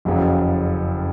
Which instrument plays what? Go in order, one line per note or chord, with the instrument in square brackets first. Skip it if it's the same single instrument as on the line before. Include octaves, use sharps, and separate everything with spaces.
[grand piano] F#1 F2 C#3 F#3